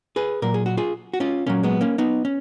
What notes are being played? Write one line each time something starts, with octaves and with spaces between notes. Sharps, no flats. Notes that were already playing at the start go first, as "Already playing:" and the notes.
G#4 B4
A#2 F#3 A#4
G#4
F#4
F4 G#4
F#4
C#4 F4
A#2 F#3 A#3 C#4
G#3 B3
A#3 C#4
B3 D#4
C#4